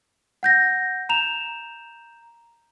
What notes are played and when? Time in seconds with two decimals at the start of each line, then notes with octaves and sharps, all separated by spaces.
0.43 F#5 G6 A#6
1.09 A#5 G6 E7 F7